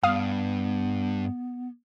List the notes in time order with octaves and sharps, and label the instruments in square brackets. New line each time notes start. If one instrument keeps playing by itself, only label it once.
[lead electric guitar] G2 [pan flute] B3 [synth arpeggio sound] F5 D#6